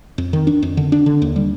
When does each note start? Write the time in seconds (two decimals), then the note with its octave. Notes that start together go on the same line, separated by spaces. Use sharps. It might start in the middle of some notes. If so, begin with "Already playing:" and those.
0.18 F2
0.33 D#3
0.47 D4
0.62 F2
0.77 D3
0.92 D4
1.06 D3
1.22 D#2
1.36 G3